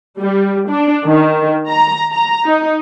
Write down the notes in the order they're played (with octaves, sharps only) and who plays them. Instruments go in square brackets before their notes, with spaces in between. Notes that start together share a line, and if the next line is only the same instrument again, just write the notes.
[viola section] G3
D4
D#3
A#5
A#5
D#4